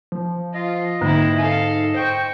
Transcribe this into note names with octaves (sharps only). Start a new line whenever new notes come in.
F3
F4 D#5
G#2 D3 A#3 C4 D#4 E4
A4 F5 G#5
C5 G5 C#6